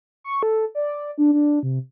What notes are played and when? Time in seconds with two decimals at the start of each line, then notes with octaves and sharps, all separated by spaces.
0.24 C#6
0.43 A4
0.75 D5
1.18 D4
1.33 D4
1.63 C3